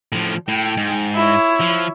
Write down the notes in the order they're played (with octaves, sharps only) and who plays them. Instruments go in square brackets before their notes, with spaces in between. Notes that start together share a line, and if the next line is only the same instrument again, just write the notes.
[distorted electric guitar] A2 F3
[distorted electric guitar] A2 [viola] G5
[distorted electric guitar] G#2
[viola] E4 C#5
[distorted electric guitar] F3